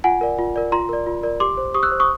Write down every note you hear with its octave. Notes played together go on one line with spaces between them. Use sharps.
F4 F#5 G#5
A#4 D5
F4
A#4 D5
F4 A#5 C6
A#4 D5
F4
A#4 D5
G4 C6 D6
C5
G4 C#6 D#6
E6 F#6
C5
C#6 D#6